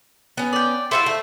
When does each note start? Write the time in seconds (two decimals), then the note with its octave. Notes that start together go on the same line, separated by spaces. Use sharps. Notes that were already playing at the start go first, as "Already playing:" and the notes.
0.37 B3 C#4
0.53 D5 G5
0.91 E4 F4 C5 E5 F#5 C#6
1.06 A3